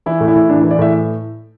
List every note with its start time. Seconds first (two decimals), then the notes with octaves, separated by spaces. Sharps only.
0.06 E3 E4
0.21 A2
0.28 E4
0.36 A2
0.50 E3 D4
0.60 E3 E4
0.71 D5
0.79 A2 E5